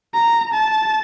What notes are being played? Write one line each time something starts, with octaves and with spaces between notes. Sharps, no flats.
A#5
A5